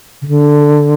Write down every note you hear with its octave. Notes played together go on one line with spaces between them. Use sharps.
C#3
D3